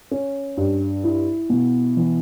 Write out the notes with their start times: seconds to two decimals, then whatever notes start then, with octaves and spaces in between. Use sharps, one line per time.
0.11 C#4
0.57 G2
1.04 E4
1.50 B2
1.97 E3